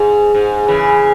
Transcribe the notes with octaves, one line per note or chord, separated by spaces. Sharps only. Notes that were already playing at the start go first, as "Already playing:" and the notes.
Already playing: G#2
G#2
C#3 E3